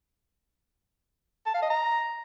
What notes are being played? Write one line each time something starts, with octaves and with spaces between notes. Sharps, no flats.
A5
F5
D#5
A#5